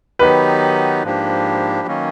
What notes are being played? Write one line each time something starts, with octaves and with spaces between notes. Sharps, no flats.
D#3 F#3 B3 D#4 G4 B4
G#2 F3 A#3 D4 G4
D#3 F#3 A#3 C#4